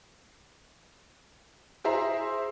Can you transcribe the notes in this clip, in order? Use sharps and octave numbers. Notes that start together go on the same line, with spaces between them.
E4 G#4 C5 E5 A#5